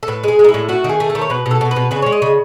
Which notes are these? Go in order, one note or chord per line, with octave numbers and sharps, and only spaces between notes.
A4
A2 B4
G#3 G#4
G#3
D#4
E4
A2
A3 F#4
D#3
G#4
A3
A4
D#3
C#5
B2 B4
B2
A4
B2
B4
B2
C#3 B4
G#3 C#5
D#5
C#3